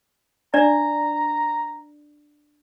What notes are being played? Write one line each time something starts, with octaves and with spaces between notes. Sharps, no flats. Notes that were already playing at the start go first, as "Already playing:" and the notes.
D4 D5 A#5